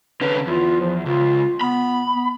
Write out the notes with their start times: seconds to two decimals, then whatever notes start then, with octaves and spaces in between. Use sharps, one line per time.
0.21 D3 C#4 B4
0.47 E2 F4
0.81 F3
1.06 C#2 F4
1.61 B3 B5
2.14 B3